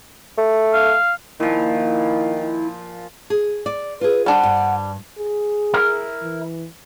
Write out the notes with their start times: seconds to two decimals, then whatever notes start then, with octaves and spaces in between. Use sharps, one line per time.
0.38 A3
0.73 F5
1.40 A#2 D#3 F3 E4
3.30 G#4
3.66 D5
4.01 F4 G#4 B4
4.26 G3 D4 C5 F#5
4.43 G2
5.18 G#4
5.74 E4 A#4
6.22 E3